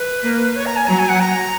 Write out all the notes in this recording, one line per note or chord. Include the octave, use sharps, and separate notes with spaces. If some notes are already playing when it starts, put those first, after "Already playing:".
Already playing: B4
A#3
C#5
A#5
G#5
F#3 A#5
G#5
F#5
A#5